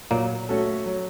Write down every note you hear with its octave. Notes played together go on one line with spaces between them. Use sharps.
A#2 F#3 A#3
A3 C#4 F#4 A4
F#3